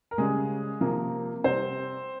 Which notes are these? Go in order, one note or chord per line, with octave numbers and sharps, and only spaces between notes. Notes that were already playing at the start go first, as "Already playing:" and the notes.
A#4
C#3 G3 G#3 G#4
C3 F3 A#3 A#4
C3 G3 C4 C5